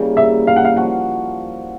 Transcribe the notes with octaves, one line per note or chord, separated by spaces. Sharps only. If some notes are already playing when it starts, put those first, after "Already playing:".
Already playing: C#3 E3 G3 A#3
E5
F5
F#5
F5
F3 F#4 F#5